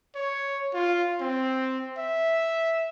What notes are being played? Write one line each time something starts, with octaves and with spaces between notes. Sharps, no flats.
C#5
F4
C4
E5